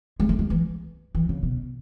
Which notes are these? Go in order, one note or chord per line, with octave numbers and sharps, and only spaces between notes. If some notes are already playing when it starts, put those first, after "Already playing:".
G#3
A3
G#3
E3
E3
C#3
B2